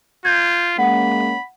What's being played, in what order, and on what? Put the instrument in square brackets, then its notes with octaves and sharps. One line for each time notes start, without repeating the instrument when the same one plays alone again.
[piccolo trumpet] F4 [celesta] G6 G#6
[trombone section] G#3 A#3 C#4 [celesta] F#5 [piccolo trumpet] B5